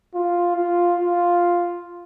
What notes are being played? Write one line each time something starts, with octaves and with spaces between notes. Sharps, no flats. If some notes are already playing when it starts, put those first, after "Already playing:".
F4
F4
F4